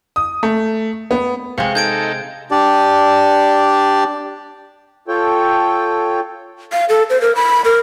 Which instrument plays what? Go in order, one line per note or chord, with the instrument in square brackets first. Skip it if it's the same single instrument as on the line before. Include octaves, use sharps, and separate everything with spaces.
[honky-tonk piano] D#6
A3
B3
[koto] C3 G#3 [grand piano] F5 [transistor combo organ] C#6
[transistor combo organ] D#4 A4 [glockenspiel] G6 G#6 D7
[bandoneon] D4 G4 D5
[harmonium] F4 A4 C#5 G5
[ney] F5
A4
C5
A#4
B5
A#4